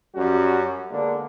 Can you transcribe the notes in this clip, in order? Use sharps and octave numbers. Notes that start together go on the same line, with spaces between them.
F#2 G3 C#4 F#4
D3 G#3 A#3 B3 D4